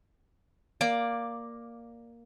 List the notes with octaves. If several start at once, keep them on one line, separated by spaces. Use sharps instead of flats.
A#3 D5 D6